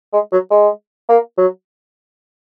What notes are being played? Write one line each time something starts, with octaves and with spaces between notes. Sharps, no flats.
G#3
F#3
G#3
A#3
F#3